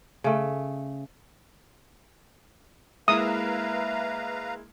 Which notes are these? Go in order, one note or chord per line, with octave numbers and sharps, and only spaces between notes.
C#3 A3
G#3 A#3 E4 B4 E5 F5 A#5 D#6